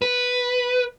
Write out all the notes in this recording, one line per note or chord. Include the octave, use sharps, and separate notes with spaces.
B4